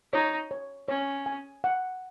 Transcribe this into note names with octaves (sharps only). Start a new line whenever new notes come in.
D#4 C#5
C#5
C#4 C#5
G#5
F#5